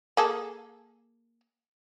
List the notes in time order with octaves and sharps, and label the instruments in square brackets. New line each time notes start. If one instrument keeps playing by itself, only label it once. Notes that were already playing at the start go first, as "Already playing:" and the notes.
[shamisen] A#3 G#4 A4